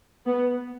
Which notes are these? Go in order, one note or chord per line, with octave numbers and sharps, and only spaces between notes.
B3